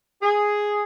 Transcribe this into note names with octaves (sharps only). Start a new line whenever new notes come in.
G#4